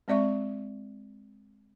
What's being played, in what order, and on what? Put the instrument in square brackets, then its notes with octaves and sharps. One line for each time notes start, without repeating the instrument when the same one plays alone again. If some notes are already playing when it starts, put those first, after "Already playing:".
[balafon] G#3 C4 D5 E5 C#6